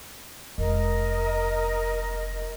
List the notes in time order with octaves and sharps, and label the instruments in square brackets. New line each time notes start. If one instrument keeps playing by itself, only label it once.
[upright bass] F1 G#3 [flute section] A#4 D#5